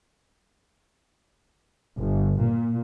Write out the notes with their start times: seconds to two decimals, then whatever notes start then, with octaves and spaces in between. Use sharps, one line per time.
1.96 G1
2.40 A#2